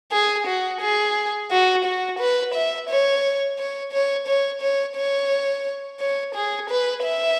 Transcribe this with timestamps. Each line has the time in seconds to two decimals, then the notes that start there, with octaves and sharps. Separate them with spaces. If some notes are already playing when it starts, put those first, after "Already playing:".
0.12 G#4
0.47 F#4
0.81 G#4
1.51 F#4
1.85 F#4
2.19 B4
2.54 E5
2.89 C#5
3.59 C#5
3.92 C#5
4.27 C#5
4.61 C#5
4.96 C#5
6.00 C#5
6.35 G#4
6.70 B4
7.04 E5